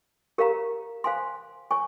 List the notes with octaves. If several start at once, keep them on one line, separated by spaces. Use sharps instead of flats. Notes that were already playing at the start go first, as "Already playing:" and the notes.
G4 A#4 C#5 F5 A#5
C5 F5 G#5 C6
C#5 G#5 C#6